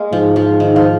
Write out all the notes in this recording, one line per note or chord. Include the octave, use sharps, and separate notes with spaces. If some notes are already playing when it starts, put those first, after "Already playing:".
Already playing: G#3 A#3
G#2 F3
F3
D#3
F3